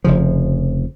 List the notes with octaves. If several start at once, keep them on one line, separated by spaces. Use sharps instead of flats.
F1 C#3 F3